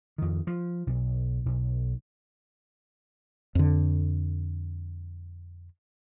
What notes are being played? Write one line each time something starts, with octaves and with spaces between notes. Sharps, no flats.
F2 D#3
F3
B1
B1
F2 D3